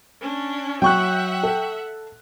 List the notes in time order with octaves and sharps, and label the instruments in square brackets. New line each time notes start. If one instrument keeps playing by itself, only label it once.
[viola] C#4 D4
[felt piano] F#3 [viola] E5 F#5 [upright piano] G5 C#6 F#6
[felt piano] A4